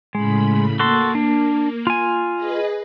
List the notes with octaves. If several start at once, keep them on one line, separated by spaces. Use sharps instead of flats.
A2 C#3 G#3 B5
A#3 F#4 A4 C6
D4
F4 G#5
G#4 B4 D#5